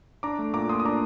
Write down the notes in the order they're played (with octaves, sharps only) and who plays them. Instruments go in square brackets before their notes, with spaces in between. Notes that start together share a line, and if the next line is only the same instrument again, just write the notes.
[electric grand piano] D4 A#5 D6
A3
A#2 A#5 D6
A#2 C6 D#6
D#6
D4 A#5 D6